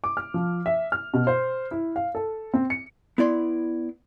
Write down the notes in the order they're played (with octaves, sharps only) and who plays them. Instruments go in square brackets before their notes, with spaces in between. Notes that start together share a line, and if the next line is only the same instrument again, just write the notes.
[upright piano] D6
F6
F3
E5
F6
B2
C5
E4
F5
A4
C4
C#7
[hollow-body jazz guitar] B3 E4 D5 C6